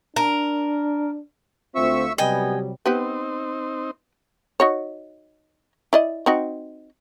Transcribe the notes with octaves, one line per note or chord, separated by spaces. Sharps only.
D4 A#4
D2 C4 F4 E5 C#6 E6
C3 F#3 G3 B3 D#5 G5 G#5
B3 C4 D#4 G4 B4
D#4 F#4 C#5
E4 D5 D#5
C4 D#4 F#4